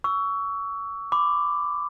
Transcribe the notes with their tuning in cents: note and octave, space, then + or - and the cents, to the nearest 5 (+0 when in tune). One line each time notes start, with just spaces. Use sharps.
C#6 +25 E6 +0
B5 +25 D6 +0